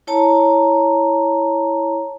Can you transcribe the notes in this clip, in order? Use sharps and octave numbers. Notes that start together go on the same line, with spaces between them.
E4 C#5 A5 A#5